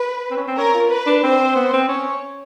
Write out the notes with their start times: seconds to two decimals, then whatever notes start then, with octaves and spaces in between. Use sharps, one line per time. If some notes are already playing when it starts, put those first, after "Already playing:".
Already playing: B4
0.31 C4
0.37 C#4
0.48 C4
0.58 C#4 A#4
0.74 F4
0.91 B4
1.07 D4
1.23 C4 C5
1.56 B3
1.73 C4
1.89 C#4 C#5